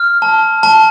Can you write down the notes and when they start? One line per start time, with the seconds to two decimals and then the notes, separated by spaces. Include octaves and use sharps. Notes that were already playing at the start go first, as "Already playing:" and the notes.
Already playing: F6
0.22 A5
0.63 A5